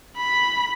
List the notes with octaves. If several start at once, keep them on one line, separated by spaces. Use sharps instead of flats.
B5